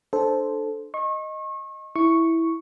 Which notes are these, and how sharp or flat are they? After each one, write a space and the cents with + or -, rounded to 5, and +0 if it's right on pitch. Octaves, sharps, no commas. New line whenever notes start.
D4 +20 A4 -10 C5 +0
D#5 +0 C#6 -35
E4 -5 C#6 +0